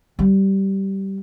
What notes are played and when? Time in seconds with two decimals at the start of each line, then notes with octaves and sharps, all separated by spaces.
0.19 G3